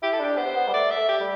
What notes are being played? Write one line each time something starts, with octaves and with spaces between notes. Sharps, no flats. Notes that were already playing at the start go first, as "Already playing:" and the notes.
E4 G4
A4
D4 G4
B3 C5
B3
G3
A3 D5
E5
A3
G4
G3